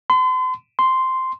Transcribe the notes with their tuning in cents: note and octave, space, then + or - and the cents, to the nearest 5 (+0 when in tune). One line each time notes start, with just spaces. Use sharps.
C6 -40
C6 -5